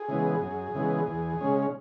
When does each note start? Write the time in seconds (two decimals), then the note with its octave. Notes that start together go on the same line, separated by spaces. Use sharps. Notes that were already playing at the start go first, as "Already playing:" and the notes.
Already playing: G#4
0.08 C#3 E3 G#3 B3
0.42 F#2
0.75 C#3 E3 G#3 B3
1.07 E2
1.41 C#3 G#3 C#4